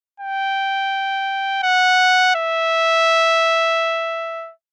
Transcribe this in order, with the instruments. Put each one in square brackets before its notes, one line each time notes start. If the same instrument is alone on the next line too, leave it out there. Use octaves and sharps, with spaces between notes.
[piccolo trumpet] G5
F#5
E5